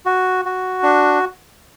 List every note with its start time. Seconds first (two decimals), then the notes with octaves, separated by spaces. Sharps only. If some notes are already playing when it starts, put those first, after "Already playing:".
0.06 F#4
0.45 F#4
0.83 D4